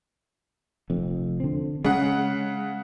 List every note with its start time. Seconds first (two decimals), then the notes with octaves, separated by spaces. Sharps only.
0.90 F1 F2
1.40 D3 C4
1.85 C#3 G#3 F#5